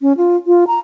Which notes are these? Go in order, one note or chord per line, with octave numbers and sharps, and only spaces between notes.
C#4
F4
F4
A#5